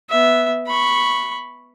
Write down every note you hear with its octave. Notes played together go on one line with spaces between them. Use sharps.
B3 E5
B5 C#6